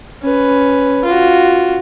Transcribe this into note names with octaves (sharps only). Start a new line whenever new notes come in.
C#4 B4
F4 F#4